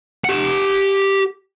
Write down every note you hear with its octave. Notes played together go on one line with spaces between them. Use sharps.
G4 F#5